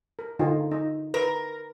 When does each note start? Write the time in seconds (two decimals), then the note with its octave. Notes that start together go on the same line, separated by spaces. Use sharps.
0.19 A#4
0.39 D3 D#4 F4
0.71 D#4
1.14 A#4 B4